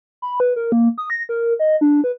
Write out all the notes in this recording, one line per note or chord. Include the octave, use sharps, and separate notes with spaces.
B5
B4
A#4
A#3
D#6
A#6
A#4
D#5
D4
B4